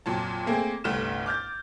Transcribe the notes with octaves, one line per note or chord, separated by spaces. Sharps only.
F2 A#2 F#3 A5
A3 A#3 C4 G#4
G1 C2 G3 A3 F6 E7
D6 F6 G6 A6